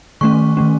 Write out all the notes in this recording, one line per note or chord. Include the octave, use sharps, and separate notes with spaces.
D#3 A3 C#4 C#6
D#3 A3 C#4